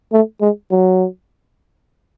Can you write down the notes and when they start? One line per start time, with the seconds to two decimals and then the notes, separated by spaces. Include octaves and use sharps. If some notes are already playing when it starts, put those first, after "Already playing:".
0.12 A3
0.41 G#3
0.71 F#3